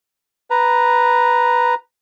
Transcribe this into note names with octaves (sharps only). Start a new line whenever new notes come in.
B4 A#5